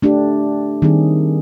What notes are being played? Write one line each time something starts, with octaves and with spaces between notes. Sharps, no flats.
A3 D4 G4
D#3 G3 C4 D#4 G#4